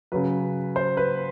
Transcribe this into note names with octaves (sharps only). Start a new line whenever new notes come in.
C#3 F#3 B4
C5
B4